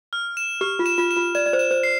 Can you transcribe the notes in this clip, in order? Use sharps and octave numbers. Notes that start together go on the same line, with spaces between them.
F6
E7
G4 F6
F4
E7
F4
E7
F4
D5 E7
D5
C5
E7
C5
C7